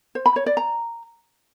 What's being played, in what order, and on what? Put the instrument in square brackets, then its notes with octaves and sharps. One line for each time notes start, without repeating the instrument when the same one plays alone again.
[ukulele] C5
B5
C#5
D5
A#5